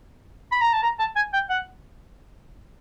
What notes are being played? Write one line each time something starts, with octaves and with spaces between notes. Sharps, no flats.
B5
A#5
A5
A#5
A5
G#5
G5
F#5